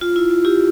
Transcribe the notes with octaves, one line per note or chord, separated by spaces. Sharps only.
F4
E4
F4
E4 G4